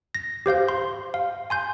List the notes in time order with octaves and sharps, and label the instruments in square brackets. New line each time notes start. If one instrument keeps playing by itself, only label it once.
[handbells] A#6
G4 C5 F5 G6
C6
F5
G#5 C6 G6